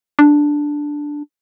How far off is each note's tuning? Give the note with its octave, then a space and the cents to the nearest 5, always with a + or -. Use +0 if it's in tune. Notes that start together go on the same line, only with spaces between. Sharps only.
D4 +0